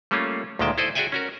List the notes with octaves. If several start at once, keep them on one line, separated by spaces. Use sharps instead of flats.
G3 A3 A#3 C#4 F4
D2 A#2 D#3 G#3 G5 A5
E4 A4 C5 D5 D#5
F#4 G#4 D5 E5 G5 G#5
C#4 F#4 A#4